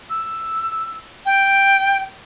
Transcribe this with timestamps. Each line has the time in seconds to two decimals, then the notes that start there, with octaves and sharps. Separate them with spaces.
0.10 E6
1.25 G5